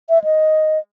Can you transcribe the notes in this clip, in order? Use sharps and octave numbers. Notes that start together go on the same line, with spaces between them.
E5
D#5